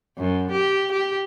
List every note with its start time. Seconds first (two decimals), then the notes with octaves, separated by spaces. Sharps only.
0.18 F#2
0.51 G4
0.92 G4